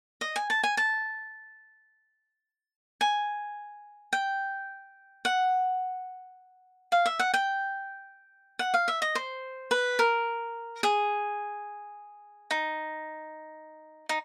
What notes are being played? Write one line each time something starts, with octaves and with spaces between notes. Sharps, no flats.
D#5
G#5
A5
G#5
A5
G#5
G5
F#5
F5
E5
F#5
G5
F#5
F5
E5
D#5
C5
B4
A#4
G#4
D#4
D#4